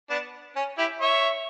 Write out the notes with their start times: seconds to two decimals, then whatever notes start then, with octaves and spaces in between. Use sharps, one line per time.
0.10 B3 D4
0.56 C#4
0.78 E4 G4
1.01 C#5 E5